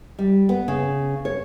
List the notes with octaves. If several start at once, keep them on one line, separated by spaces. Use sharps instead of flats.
G3
B3
C#3
C#5